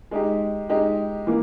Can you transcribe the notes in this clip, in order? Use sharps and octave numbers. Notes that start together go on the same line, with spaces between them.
G#3 D#4 G4
G#3 D#4 G4
E3 A#3